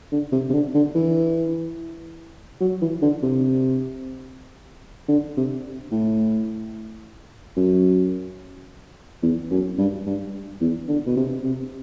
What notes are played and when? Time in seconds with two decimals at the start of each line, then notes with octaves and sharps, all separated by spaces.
0.12 D3
0.33 C3
0.50 C3
0.53 D3
0.75 D3
0.95 E3
2.60 F#3
2.82 E3
3.02 D3
3.23 C3
5.08 D3
5.37 C3
5.91 A2
7.57 F#2
9.23 E2
9.51 F#2
9.78 G2
10.06 G2
10.61 E2
10.88 D3
11.07 B2
11.16 C3
11.44 C3